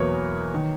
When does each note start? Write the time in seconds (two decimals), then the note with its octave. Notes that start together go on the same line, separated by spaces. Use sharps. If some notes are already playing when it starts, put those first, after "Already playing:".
Already playing: E2 B2 F#3 A#3 A#4 B4 C#5
0.54 D#3